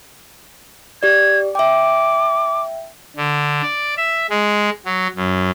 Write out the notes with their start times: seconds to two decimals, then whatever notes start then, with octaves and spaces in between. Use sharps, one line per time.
1.03 G4 D5 G#6
1.55 E5 G5 D6
3.16 D3
3.62 D5
3.97 E5
4.30 G#3
4.85 F#3
5.16 F#2